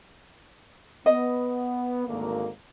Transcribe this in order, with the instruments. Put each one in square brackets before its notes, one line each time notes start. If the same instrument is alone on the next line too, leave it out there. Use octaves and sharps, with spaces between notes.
[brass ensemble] B3 [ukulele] D#5
[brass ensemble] G#1 D2 A#3